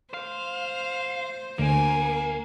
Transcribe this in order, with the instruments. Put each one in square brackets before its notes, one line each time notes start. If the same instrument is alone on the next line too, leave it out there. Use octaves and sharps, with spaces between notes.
[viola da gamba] C5 [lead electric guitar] F5
[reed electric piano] D2 [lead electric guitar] A#3 [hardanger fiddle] G#5